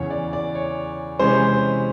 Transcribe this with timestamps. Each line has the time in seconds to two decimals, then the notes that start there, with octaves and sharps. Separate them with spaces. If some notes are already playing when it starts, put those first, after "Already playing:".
Already playing: E2 C#3 E3 C#5
0.10 D5
0.33 D5
0.55 C#5
1.19 C3 E3 G#3 C#4 C5